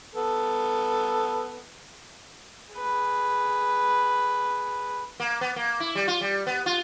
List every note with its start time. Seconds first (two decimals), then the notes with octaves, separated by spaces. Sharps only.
0.15 B3 A4
2.74 G#4 B4
5.20 A#3
5.41 B3
5.56 A#3
5.80 E4
5.95 G3
6.08 F4
6.21 G3
6.47 B3
6.66 F4